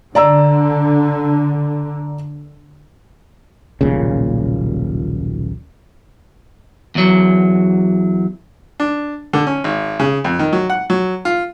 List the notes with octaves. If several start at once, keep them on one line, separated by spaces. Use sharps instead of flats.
D3 D5 A#5 E6
D#1 B1 A#2 C#3
E2 F#3
D4
D3
C#4
G#1
C#3
F2
D#3
F#3
F#5
F#3
F4